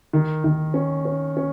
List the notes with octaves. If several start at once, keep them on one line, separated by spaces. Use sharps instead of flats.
D#3
D#3
C#4
C#4
C#4